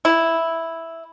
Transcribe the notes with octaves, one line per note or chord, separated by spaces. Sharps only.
E4